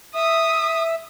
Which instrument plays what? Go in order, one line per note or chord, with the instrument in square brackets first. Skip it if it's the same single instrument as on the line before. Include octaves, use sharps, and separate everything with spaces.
[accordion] E5 [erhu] D#6